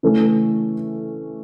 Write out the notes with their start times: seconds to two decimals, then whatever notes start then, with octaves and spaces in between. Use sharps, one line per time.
0.03 C#3 E3 A3 C#4